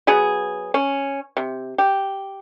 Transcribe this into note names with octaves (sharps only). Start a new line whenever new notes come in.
F#3 B3 G#4
C#4
C3
G4